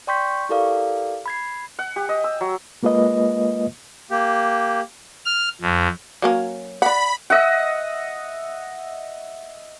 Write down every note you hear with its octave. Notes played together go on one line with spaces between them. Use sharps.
D5 G5 C6 C#6 G6 B6
C#6
E4 G4 A4 A#4 D5 F5
B5 G#6 C7
F#5
G4
D#5
E6
F#3
G#3 A#3 F4 B4 D#5
A#3 G4
F6
F2
F#3 A#3 C#4
D5 F#5 B5
D#5 E5 F#5